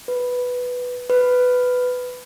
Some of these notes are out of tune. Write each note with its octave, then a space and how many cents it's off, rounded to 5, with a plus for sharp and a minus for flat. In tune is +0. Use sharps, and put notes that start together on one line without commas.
B4 +0
B4 +10